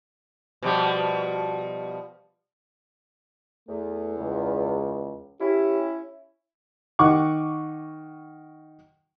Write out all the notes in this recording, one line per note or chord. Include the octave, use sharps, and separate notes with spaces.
B2 F3 G3
E2 A3
C#2
C#4 E4 G4
D#3 F#5 C#6 D6